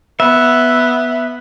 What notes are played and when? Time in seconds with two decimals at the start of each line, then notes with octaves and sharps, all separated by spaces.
0.20 B3 E5